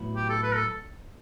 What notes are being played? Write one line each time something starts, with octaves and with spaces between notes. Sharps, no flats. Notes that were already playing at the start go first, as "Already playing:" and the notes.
Already playing: A2 F#3 B3 E4
G4
A4
B4
A4